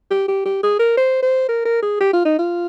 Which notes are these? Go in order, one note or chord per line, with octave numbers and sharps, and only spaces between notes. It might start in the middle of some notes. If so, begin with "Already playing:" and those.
G4
G4
G4
G#4
A#4
C5
C5
A#4
A#4
G#4
G4
F4
D#4
F4